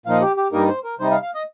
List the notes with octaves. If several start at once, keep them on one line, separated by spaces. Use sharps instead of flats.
A#2 F3 D#4 F5
G4
G4
G2 G3 A#3 D#4 A#4
C5
A#4
C3 G3 D#4 C5
F5
F5
D#5